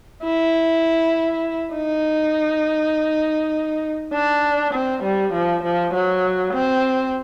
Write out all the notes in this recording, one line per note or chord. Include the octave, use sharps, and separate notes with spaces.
E4
D#4
D4
C4
G3
F3
F3
F#3
C4